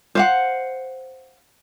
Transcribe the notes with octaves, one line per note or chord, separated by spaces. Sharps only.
C5 F5 F#5